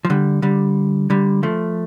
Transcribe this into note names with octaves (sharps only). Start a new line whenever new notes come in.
F3
D3 G3
D3 G3
D3 G3
F3 A3